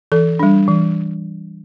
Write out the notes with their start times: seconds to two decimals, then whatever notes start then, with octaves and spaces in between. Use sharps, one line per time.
0.12 E3 A4
0.39 G3 D4
0.68 E3